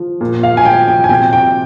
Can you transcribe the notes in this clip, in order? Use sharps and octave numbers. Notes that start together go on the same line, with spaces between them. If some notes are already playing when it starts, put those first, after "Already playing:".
Already playing: F3
A#2
F5
G#5
F3 G5
G5
G#5
C3 G5
G5